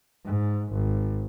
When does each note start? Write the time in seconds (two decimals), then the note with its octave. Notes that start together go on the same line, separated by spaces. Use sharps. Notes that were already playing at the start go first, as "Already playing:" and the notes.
0.25 G#2
0.73 G#1